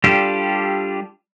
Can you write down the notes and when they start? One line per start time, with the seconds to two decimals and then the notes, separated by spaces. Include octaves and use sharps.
0.04 G3 D4 F4 G4 A4